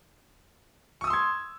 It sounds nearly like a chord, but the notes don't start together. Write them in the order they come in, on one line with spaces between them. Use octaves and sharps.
C#6 D#6 E6 C6 G#6